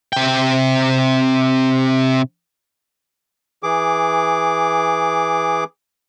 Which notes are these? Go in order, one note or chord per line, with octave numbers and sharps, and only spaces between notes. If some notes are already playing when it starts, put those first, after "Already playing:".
C3 G5
E3 G#4 D6